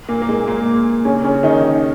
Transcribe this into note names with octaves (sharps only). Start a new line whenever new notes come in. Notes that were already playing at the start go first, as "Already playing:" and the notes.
A#2 A#3
A#3
G#3
A#2 A#3
C#3 C#4
C#3 C#4
D#3 D#4